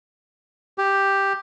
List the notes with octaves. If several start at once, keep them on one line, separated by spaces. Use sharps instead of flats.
G4